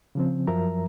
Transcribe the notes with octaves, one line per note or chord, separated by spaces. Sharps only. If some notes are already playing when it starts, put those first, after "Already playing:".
C#3 F3 C4
F#2 F3 F#3 A#4 E5 A#5